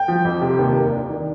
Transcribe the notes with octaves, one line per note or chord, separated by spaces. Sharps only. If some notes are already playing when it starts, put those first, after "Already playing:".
Already playing: G5
F3
F2
C3
D#2
A#3
D4
D#3